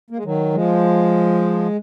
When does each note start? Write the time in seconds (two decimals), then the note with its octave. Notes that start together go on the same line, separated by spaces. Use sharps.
0.10 A#3
0.17 G#3
0.25 D#3 F#3
0.53 F3 G#3